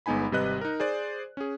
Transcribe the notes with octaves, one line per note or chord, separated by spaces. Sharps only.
G1 G#3 B3 D#4 G#5 B5
G#1 C3 G3 B4 D#5 F#6
D#4 A#4
G#4 C5 D5
C#4 G#4